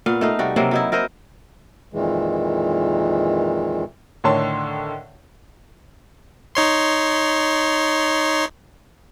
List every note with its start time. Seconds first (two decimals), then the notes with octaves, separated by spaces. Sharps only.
0.06 A#2 B3 F5
0.21 A3 D#4 F5
0.39 C3 G3 F#4
0.56 C3 F#3 A#3 C4
0.71 F#3 D#4 E4
0.92 E4 A#4 C5 D#5
1.93 F2 A#2 D#3 E3 G#3
4.24 A2 D3 D#3 C#5 A5 C6
6.55 D#4 C#5 C6